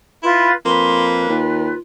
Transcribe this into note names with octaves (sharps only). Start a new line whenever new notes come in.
E4 F4 B4 C6
F2 A#3 B4 C6
D#2 F4